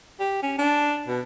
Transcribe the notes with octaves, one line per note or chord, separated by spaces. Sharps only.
G4
C#4
D4
B2